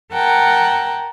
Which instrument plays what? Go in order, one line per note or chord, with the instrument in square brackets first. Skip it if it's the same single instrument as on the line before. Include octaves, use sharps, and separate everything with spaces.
[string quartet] A#4 F#5 G5 A5